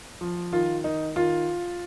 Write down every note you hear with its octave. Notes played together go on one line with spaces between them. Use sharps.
F3
D#3 F4
D#3 D#4
D#3 F4